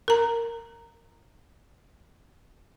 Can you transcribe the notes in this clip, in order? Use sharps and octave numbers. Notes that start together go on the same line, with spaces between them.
A#4 A#5